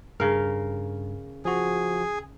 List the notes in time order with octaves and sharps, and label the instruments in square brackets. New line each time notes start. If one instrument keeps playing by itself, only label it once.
[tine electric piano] G2 [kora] C#3 A#4
[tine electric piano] F3 F#4 [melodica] G#4